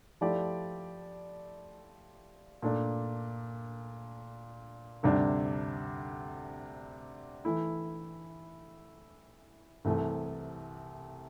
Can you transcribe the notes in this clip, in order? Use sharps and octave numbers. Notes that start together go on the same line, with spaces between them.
F3 A3 E4 G4 D5
A#2 A3 D4
D2 C3 G3 D4
E3 A3 E4
C2 C3 E3 A3